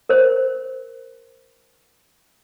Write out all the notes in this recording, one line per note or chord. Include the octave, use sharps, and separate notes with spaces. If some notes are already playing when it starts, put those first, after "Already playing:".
A#4 C5